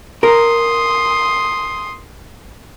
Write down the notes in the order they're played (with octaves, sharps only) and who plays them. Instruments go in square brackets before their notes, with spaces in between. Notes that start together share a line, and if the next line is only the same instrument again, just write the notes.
[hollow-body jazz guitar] A#4 [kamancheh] C6 D#6